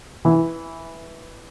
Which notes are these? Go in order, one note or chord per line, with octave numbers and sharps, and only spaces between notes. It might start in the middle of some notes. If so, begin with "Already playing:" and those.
E3